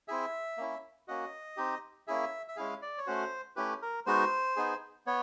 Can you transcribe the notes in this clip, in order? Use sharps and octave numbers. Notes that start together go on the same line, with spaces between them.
C4 E4 G#4 E5
A#3 C#4 E4
A#3 C#4 F#4 D#5
C4 D#4 G4
A#3 C#4 E4 G#4 E5
E5
G#3 C#4 E4 G#4 F5
D5
C#5
A3 C#4 F#4 C5
A3 C#4 E4 G4 B4
A#4
G#3 B3 D#4 F#4 C5
B3 D#4 G#4
B3 C#5